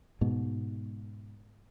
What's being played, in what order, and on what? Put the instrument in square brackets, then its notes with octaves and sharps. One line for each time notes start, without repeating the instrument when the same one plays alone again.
[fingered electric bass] G#2 B2